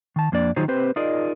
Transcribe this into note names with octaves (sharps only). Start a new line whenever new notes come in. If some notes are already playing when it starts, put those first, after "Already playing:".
D#3 A5
F2 A#3 D4 D5
D#3 F#3 D#4 F4 G#4 C5
C4 G4 B4 C5
D#4 F4 G#4 A#4 D5 D#5